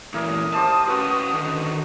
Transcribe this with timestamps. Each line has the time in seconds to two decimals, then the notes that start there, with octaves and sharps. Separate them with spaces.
0.14 A#2 E3 E4 A#4 D6 D#6
0.54 G4 C5 D5 A5
0.88 C#4 F#4 B4
1.34 D3 D#3